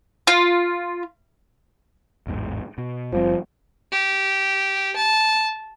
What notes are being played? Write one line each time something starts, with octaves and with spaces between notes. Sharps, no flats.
F4
A1 E2 G#2
B2
F#1 F3 G3 C4
G4
A5